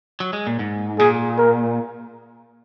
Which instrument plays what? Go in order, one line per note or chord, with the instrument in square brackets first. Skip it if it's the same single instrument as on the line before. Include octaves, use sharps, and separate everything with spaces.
[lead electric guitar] F#3
G#3
A#2
G#2
[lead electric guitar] A#2 [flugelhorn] G#4
[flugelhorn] A#4